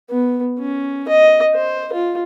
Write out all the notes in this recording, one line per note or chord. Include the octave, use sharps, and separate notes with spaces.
B3
C#4
D#5
C5
F4